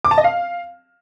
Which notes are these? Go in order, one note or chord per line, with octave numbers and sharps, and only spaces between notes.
D6
A5
D#5
F5